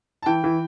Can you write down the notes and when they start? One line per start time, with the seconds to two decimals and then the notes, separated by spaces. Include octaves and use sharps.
0.22 A5
0.26 E3 G5
0.44 E3